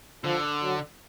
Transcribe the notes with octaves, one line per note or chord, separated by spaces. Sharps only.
D3 F3
F#3